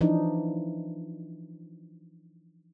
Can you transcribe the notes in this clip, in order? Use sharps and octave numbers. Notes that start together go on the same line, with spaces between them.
E3 F3 D4 D#4